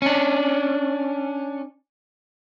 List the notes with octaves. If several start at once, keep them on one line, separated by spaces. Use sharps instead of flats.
C#4 D4